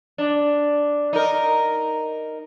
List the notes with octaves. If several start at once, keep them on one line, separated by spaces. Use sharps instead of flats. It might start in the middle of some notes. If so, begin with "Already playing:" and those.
D4
D#4 A#4